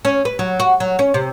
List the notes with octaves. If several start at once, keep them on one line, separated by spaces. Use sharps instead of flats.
C#4
B4
F#3
F#4
F#3
C#4
C3